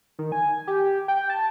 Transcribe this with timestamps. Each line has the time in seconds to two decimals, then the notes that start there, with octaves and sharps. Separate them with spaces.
0.19 D#3
0.32 G#5
0.67 G4
1.08 G5
1.30 A5